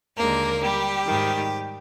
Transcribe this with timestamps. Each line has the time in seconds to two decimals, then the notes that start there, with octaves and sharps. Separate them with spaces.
0.17 D#2 D3 G#3 A#3 A#4
0.61 G3 G4
1.07 G#2 D#3 G3